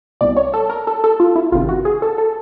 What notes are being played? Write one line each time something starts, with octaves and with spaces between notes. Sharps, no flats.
C2 B2 D5
C#5
A4
A#4
A4
A4
F4
E4
G1 F2 C3 D#3 F4
F#4
G#4
A4
A4